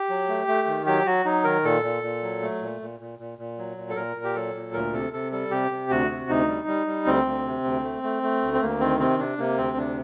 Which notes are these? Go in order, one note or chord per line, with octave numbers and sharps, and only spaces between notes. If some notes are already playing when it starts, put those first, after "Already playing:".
Already playing: G4
F#3
A3
A3
D#3
F#3 G4
F#3 F#4
F#3 D#4
D#3 A#4
A#2 A4
A#2
A#2
F#3
A3
A#2
A#2
A#2
A#2
A#2
F#3
A#2
A4
A#2 A#4
A#2
G4
F#3 A4
A#2
D2 A#4
C3 A4
C3 A4
G3 A4
C3 G4
C3
D2 F#4
C3
D2 D#4
G3
G3
G3
D2 C4
D2
C3
D2
A3
A3
A3
D2
C4
D2 A#3
D#3 C4
C3 C4
C3 D4
C3 A#3
D2 C4
C3 D4